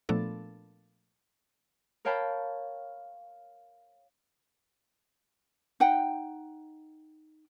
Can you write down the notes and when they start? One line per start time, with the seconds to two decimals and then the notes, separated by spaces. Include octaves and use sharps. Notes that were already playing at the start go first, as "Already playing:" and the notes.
0.09 A#2 F3 A3 B3 D4 A4
2.05 A#4 C#5 F5 G5 A5 B5
5.80 D#4 F#5 G5